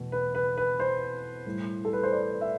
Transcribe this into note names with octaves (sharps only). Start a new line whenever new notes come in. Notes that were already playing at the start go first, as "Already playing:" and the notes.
Already playing: E2 B2 A3
B4
B4
B4
C5
A2 G3
A4
B4
C5
D5
E5